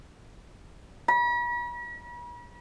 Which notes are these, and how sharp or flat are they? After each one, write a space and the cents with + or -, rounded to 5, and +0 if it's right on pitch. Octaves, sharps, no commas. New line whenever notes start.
B5 -45